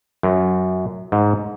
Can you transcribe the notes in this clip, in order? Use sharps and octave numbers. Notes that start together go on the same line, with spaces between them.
F#2
G#2